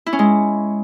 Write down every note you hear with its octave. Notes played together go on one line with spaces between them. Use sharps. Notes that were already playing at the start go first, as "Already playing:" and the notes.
E4
C#4
G#3